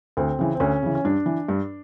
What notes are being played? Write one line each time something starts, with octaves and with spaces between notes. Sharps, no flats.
D2 C4
C#3 E3
C4
D2 C#4
C#3 E3
C#4
G2 D4
E3
G2